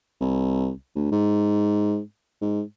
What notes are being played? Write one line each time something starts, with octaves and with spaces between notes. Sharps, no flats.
C2
D2
G#2
G#2